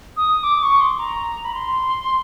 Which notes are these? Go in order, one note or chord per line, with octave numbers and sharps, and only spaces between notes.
D#6
D6
C#6
C6
A#5
B5
C6